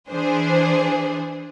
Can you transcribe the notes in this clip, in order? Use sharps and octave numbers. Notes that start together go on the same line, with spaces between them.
E3 D4 G#4 C5